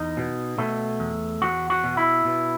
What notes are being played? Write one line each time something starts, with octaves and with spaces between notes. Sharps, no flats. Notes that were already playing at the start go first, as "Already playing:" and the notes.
Already playing: E2 D#4
B2
B2 A3
E2
E2 F#4
F#4
B2
E4
B2